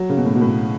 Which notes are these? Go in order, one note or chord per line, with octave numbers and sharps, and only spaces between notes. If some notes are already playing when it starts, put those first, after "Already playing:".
Already playing: F#3
C#3
B2
A2
B2
A2